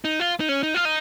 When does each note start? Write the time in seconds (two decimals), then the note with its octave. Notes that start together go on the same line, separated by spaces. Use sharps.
0.05 D#4
0.20 F4
0.40 D#4
0.49 C#4
0.63 D#4
0.74 F4
0.85 D#4